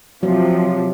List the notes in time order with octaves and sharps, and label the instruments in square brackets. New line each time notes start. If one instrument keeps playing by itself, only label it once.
[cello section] C3 F3 [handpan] F#3